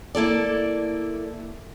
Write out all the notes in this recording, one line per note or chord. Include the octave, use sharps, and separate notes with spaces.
A#3 E4 A4 D5